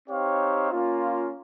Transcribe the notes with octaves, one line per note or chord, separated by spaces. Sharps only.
C4 D#4 G4 C#5 F5
A#3 C#4 F4